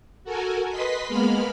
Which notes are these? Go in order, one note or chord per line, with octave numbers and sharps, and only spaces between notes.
F#4 A4 A#4 G#5
B4 D#5 C6 B6
G#3 A#3 B3 B5 F6